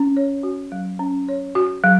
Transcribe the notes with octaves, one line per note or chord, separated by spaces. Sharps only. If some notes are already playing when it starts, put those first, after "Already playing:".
Already playing: C#4
C#5
F#4
F#3
C#4
C#5
F#4
F#3